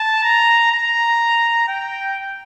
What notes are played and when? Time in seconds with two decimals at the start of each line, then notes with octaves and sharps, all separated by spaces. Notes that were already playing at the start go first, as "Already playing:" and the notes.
Already playing: A5
0.24 A#5
0.72 A#5
1.68 G5